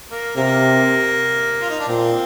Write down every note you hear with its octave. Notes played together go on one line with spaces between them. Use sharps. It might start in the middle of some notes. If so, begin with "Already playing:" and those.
A#3
C3 A#3
F4
D#4
D4
A#2 C4